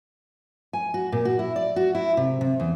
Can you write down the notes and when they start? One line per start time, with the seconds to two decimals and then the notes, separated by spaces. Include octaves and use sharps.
0.73 G#5
0.94 F#4
1.12 A#2
1.25 F#4
1.39 E4
1.56 D5
1.76 F#4
1.95 E4
2.17 C3
2.41 C3
2.60 E2